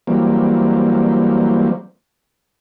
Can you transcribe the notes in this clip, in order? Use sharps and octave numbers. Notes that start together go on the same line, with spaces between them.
E3 F#3 G3 A#3 C4